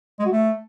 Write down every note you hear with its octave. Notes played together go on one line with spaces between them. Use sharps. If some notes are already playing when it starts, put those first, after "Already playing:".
G#3
F#4
A3